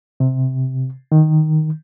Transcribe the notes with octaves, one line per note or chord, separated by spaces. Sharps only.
C3
D#3